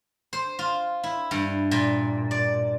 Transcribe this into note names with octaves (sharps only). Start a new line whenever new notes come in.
C5
F4
E4
G2
A#2
D5